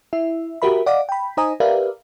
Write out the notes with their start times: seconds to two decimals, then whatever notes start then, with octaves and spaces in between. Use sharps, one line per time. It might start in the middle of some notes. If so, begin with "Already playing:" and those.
0.13 E4 E5
0.62 F#4 G4 A#4 E5 B5
0.86 D5 D#5 F5 F#5 D6
1.09 G5 B5
1.37 D#4 C5 D#5 G#5 A#5 D#6
1.60 G4 A#4 B4 D5 E5 F5